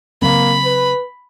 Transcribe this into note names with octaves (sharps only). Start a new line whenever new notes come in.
C#3 F#3 A#3 C4 B5
B4